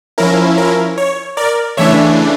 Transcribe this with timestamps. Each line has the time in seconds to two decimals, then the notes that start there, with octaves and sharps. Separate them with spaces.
0.18 F3 C#4 E4 A#4
0.58 A#4
0.98 C#5
1.37 A#4 D5
1.77 C#3 E3 A3 D4 C#5 E5